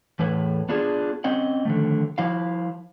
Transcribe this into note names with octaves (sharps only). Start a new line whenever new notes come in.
E2 A2 E3 B4 C#5
B3 D4 F4 G#4
C4 C#4 D#5 F#5
D3 D#3 F3 A3
F3 E4 F5